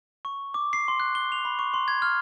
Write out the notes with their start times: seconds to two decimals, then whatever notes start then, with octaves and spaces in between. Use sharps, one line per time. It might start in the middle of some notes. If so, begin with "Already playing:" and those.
0.25 C#6
0.54 D6
0.73 C7
0.88 C6
1.00 F#6
1.15 G7
1.32 F7
1.45 B5
1.59 C#6
1.74 C6
1.88 G#6
2.02 F6